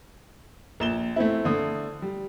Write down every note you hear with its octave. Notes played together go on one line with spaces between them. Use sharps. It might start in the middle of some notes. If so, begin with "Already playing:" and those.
A#1 E7 G7
A3 C4 E4
D3 A3 D#6
G3